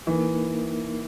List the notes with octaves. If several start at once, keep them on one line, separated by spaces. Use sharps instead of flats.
E3 A#3 D#4 A#4